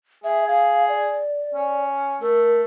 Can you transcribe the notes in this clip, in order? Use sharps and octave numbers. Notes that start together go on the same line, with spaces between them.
G#4 E5
G#4 F5
D5
C#4
A3 A#4